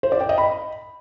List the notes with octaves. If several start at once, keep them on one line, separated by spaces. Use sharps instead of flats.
C5
D5
G5
D#5
B5